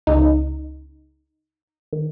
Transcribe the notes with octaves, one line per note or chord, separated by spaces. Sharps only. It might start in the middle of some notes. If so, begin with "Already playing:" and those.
C#2 C#3 D#4
D#3